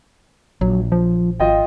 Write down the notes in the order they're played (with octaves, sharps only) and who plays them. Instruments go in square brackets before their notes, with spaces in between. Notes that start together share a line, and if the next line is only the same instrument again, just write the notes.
[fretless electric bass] A#1 [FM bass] F#3
[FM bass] F3
[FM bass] G#1 [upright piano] F4 D#5 G5